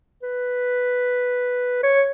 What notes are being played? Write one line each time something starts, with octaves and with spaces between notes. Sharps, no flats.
B4
C#5